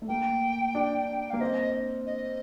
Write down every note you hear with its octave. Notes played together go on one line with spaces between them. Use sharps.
A3
A#3 G5
D4
A#3 F5
C4 D#5
D#5